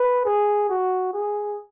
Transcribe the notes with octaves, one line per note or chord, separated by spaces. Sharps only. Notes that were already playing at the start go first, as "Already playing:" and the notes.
Already playing: B4
G#4
F#4
G#4